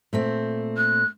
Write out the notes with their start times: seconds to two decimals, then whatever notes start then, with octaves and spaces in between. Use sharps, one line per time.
0.13 A#2 A3 C4
0.77 F#6